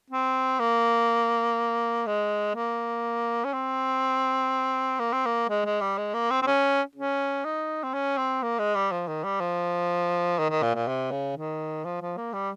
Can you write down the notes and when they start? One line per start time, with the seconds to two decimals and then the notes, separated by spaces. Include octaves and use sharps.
0.10 C4
0.60 A#3
2.07 G#3
2.55 A#3
3.45 C#4
3.53 C4
5.00 A#3
5.13 C4
5.26 A#3
5.49 G#3
5.65 G#3
5.81 G3
5.98 G#3
6.14 A#3
6.31 C4
6.42 C4
6.47 C#4
6.95 C#4
7.45 D#4
7.83 C4
7.94 C#4
8.18 C4
8.43 A#3
8.59 G#3
8.75 G3
8.92 F3
9.08 D#3
9.24 G3
9.41 F3
10.39 D#3
10.50 D#3
10.62 A#2
10.75 A#2
10.88 C3
11.11 C#3
11.37 D#3
11.85 F3
12.01 F3
12.17 A#3
12.33 G3